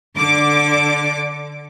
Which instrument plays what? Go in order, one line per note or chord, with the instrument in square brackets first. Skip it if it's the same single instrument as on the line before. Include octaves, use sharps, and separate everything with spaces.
[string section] D3 D6